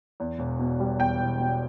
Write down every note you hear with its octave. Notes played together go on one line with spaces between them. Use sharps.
E2
E1
B2
G3
E2 G5
E1
B2